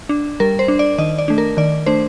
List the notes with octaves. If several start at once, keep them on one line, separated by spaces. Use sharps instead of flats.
D4
G3 A#4
C5
D4
D5
D#3 D#5
D5
A3 D4
A#4
D#3 D5
A3 D4 C5